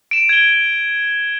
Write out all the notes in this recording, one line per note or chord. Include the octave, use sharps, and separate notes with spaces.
D7 E7
G#6 G7